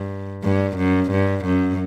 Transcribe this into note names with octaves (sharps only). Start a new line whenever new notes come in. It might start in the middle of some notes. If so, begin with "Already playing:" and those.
Already playing: G2
G2
F#2
G2
F#2